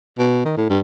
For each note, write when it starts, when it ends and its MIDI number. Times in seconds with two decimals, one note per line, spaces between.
0.19 0.44 47
0.45 0.57 51
0.57 0.68 45
0.70 0.79 43